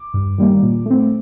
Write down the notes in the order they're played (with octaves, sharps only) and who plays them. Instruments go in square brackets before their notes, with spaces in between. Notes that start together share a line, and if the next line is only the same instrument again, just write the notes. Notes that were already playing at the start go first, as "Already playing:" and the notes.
Already playing: [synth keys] D6
G2
D#3 G3 A#3
A#2
A3 C4